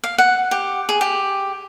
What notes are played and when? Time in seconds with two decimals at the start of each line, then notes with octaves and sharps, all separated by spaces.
0.04 F5
0.18 F#5
0.51 G4
0.89 G#4
1.01 G4